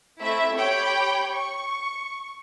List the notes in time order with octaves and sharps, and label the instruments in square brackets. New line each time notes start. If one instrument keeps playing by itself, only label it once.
[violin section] A3 C4 E4 E5
G4 C#5 G5 B5
C#6